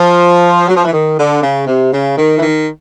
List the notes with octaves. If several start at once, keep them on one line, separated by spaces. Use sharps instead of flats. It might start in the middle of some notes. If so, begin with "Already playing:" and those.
Already playing: F3
F#3
F3
E3
D#3
D3
C#3
C3
C#3
D#3
E3
D#3